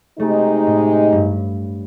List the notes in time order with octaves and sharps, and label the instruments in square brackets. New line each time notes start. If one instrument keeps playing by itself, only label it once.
[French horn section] C3 G#3 D#4 [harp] A3
[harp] A2
G2